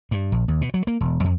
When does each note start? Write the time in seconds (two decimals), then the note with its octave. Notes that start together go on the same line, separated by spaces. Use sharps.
0.11 G2
0.32 A#1
0.48 D#2
0.61 B2
0.74 F#3
0.87 A#3
1.01 E1
1.24 F2